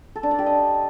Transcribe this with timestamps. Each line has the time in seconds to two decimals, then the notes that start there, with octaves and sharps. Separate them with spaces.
0.16 A4
0.23 D4
0.31 D5
0.39 G4
0.46 D#5